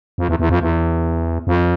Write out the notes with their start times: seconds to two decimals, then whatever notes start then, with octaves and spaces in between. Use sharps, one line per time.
0.18 F2
0.29 E2
0.39 E2
0.50 F2
0.61 E2
1.47 F2